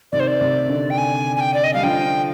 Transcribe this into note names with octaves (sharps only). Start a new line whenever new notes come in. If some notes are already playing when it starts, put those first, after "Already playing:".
C3 D#3 D5
C5
D5
C3
D3
G5
G#5
G#5
G5
D5
D#5
G3 F5
D3 F3 G5